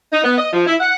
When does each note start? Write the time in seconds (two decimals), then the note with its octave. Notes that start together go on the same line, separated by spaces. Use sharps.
0.12 D#4
0.24 B3
0.38 D#5
0.53 F3
0.66 E4
0.80 F#5